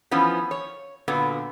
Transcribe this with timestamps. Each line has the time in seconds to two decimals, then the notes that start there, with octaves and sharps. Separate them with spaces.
0.11 E3 F3 B3 C#4
0.51 C#5
1.08 A#2 D3 B3 F#4